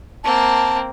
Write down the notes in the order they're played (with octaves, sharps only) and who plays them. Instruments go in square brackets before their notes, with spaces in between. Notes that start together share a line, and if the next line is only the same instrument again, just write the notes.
[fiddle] A#3 C4 [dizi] A5